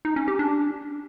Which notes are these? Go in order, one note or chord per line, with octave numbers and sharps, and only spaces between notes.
D#4
C#4
G4
D4